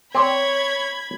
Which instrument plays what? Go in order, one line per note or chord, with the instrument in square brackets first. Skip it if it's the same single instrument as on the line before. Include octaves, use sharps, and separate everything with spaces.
[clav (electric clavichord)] C4 D5 [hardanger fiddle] C#5 [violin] B5 G#6